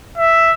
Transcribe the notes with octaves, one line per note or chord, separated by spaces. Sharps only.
E5